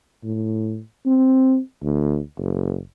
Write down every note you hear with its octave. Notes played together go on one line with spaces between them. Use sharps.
A2
C4
D2
F#1